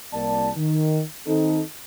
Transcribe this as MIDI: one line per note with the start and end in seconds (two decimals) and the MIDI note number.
0.13 0.49 36
0.13 0.49 58
0.13 0.49 74
0.13 0.49 81
0.56 1.01 51
1.26 1.62 51
1.26 1.62 60
1.26 1.62 63
1.26 1.62 69